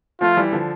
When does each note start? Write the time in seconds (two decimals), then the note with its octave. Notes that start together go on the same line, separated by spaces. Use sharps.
0.21 F3 A3 F4
0.37 E3 G3
0.52 D3 F3